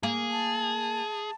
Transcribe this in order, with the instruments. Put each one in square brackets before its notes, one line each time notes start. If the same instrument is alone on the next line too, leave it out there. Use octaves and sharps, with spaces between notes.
[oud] A#3 [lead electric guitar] G#4
[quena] A5